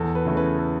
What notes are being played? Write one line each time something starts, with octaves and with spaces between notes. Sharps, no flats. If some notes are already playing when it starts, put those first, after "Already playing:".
Already playing: E2 A4
B4
C#3 E3 A3
B4
A4